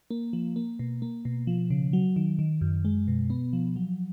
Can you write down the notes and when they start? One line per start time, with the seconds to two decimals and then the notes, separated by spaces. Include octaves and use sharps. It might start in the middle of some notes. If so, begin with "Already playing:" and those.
0.11 A#3
0.33 F3
0.56 A#3
0.79 B2
1.02 A#3
1.25 B2
1.47 F3
1.71 C#3
1.93 F#3
2.16 D#3
2.39 D#3
2.61 F#2
2.85 G#3
3.08 B2
3.30 B3
3.53 F3
3.76 F#3